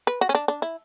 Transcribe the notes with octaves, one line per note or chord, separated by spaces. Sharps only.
B4
F#4
C#4
D4
D4
E4